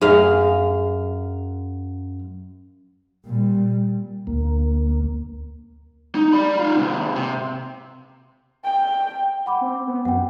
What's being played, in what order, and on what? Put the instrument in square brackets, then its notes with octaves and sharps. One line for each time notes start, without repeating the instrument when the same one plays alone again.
[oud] F#2 G#4 F5
[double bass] A#2 G3
[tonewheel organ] D2 A#3
[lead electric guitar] D#4
D5 B5
D#4 F4
G#2 C3
C3
[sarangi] G5
[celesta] F#5 B5 D6
[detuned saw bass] C4
B3
[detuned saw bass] F#2 [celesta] F#5 G5